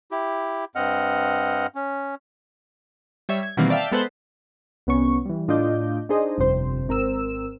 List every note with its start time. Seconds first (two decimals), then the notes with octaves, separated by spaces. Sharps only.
0.11 E4 G4
0.75 G2 C4 D#5 F#5 F6
1.75 C#4
3.29 G3 C#5 E5
3.43 G#6
3.57 B2 D#3 E3 G3 A#3 C4
3.70 D5 E5 F5 G5 A5
3.92 G#3 B3 A4 B4 C5
4.87 C2 B3 C#4 C#6
5.26 E3 G3
5.48 A2 D4 F4 D#5 D6 G6
6.09 D4 D#4 G#4 C5 D#5
6.38 G1 F2 C3 C5
6.88 G#1 C4 A#4 C5 E6 E7